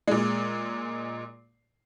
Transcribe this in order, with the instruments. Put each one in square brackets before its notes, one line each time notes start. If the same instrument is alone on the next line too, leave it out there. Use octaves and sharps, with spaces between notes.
[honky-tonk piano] A#2 G#3